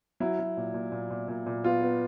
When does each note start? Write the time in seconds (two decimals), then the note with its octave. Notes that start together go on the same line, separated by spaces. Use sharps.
0.20 F#3 E4
0.39 F#3
0.57 A#2
0.74 A#2
0.92 A#2
1.10 A#2
1.28 A#2
1.46 A#2
1.64 B3 F4
1.82 B3